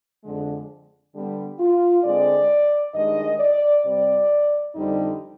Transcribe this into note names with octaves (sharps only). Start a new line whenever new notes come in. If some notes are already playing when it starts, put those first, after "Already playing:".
F2 D3 G#3
D3 G3 B3
F4
D3 G#3 C4 D5
G2 D#3 G#3 D#5
D5
C3 G3 C4 D5
F2 D3 G3 C4 D#4